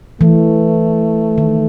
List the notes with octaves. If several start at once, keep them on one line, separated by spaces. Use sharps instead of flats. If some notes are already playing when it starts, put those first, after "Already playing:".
E3 A3
D#3